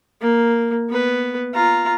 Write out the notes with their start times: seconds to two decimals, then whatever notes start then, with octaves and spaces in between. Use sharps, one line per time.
0.21 A#3
0.90 B3 B4
1.54 F4 A#5